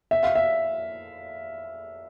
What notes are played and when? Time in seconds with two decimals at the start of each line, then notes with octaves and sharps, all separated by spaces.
0.11 E5
0.23 F5
0.35 E5